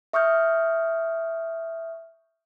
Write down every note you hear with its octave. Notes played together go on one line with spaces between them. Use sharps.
E5 C#6 D#6 F6 G6